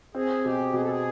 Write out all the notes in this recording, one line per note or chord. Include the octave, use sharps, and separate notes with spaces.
C4 G#4
B2 G4
B2 G#4
A4
G#4